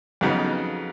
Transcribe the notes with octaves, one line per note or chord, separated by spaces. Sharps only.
F2 C#3 F#3 B3 D#4